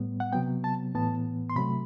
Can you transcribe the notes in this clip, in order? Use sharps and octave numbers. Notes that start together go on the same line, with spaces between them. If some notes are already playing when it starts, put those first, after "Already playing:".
Already playing: A2 G3 B3
F#5
C3 F#3 B3 G5
A5
A2 E3 B3 A5
C6
C3 F#3 A3 B5